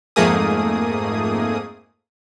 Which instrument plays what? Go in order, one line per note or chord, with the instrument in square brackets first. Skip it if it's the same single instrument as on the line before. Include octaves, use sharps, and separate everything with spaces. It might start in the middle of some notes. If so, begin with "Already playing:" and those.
[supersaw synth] F2 G#2 A3 A#3 G#4 D#6